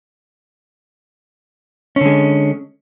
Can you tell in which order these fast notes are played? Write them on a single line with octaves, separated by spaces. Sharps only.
C#4 D3 G#3